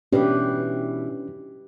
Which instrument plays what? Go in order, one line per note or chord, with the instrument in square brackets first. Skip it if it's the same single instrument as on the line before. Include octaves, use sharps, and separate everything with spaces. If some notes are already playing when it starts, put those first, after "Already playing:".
[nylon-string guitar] B2 E3 [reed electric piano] C#4 D4 [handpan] G4 B4